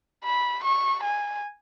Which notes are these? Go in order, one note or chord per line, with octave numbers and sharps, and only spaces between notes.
B5
C#6
G#5